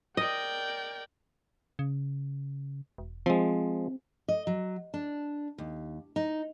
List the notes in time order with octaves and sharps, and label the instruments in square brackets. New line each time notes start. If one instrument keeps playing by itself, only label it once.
[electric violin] A#4 D5 [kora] D#5 [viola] G5
[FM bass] C#3
E1
[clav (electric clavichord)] F3 G#3 [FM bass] C4
[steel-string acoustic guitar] D#5
F#3
D4
D#2
D#4